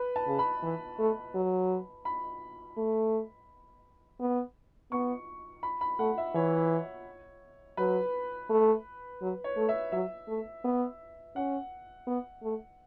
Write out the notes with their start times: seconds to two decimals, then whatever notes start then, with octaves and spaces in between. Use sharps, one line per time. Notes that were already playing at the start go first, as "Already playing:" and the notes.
Already playing: B4
0.16 A5
0.27 C#3
0.39 B5
0.63 E3
0.99 A3
1.35 F#3
2.05 B5
2.77 A3
4.20 B3
4.92 B3 C#6
5.63 B5
5.81 B5
5.99 A3 F#5
6.18 E5
6.35 E3 C#5
7.77 F#3 B4
8.50 A3
9.21 F#3
9.44 C#5
9.57 A3
9.69 E5
9.92 F#3 E5
10.28 A3
10.64 B3
11.36 C#4 F#5
12.07 B3
12.43 A3